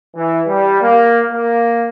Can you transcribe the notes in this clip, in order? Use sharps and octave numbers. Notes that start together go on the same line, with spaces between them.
E3
G3
A#3
A#3